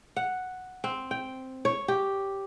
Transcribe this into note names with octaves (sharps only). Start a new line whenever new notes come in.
F#5
C4
G5
C#5
G4